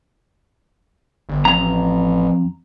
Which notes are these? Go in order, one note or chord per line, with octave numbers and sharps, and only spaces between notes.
G1
A1 F2 A#5